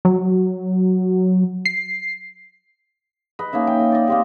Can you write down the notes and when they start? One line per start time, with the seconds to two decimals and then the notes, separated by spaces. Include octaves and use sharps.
0.05 F#3
1.65 C7
3.39 B4 D#5
3.53 A#3 C#4 D#4 E5
3.67 G5
3.80 D#5
3.92 D5 D#5
4.08 A#3 C4 G4